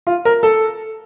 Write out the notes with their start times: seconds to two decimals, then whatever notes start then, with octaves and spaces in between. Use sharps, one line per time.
0.07 F4
0.25 A#4
0.43 A4